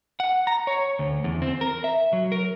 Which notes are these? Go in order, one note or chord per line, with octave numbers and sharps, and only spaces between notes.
F#5
A#5
C#5
D2
E2
C4
A#4
E5
F#3
A#4